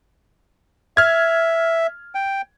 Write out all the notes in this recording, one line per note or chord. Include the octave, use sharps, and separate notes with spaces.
E5 F6 G#6
G5